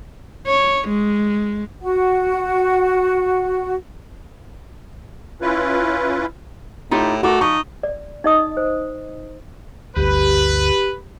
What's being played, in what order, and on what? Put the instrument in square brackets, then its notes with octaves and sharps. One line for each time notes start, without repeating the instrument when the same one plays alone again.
[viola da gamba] C#5
G#3
[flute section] F#4 F#5
[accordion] C#4 E4 F4 B4
[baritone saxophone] A2 [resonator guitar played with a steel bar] D#4 F4 G4
[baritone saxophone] A3 [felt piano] F#4 D6 [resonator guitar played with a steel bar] A#4
[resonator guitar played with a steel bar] F3 [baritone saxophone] D#4 [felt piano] C#6
[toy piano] D5
D#4 D#5 D#6
C5
[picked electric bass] G1 D2 [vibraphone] G4 [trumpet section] B4